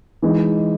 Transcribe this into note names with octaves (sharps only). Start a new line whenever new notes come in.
E3 G#3 D#4